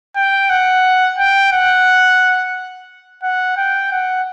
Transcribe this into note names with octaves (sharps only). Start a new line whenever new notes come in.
G5
F#5
G5
F#5
F#5
G5
F#5